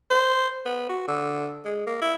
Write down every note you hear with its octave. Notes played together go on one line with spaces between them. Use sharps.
C5
B3
F#4
D3
G#3
A#3
E4